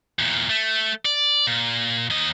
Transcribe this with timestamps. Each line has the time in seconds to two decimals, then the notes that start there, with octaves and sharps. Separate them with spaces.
0.19 E2 A#2
0.49 A3
1.05 D5
1.47 A#2
2.10 D#2 D#5